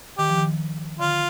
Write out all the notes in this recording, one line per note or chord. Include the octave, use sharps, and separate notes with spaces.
D#3 G4
F3
D#3
D3 F4